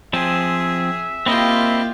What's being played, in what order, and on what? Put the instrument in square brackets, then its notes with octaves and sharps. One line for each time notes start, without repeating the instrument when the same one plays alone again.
[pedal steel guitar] F3 C4 [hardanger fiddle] G#4 [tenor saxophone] E5
[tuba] A#3 [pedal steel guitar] C4 E4 D#5 [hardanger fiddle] F4 G4